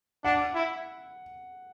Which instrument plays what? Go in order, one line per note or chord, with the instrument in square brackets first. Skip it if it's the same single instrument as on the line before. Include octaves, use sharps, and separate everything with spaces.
[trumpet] D4 [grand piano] F#5
[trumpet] E4